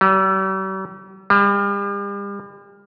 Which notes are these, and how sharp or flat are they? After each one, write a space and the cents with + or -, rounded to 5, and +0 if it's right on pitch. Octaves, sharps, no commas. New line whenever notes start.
G3 -45
G3 +40